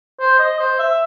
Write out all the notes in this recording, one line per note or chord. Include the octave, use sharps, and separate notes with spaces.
C5
D#5
C5
E5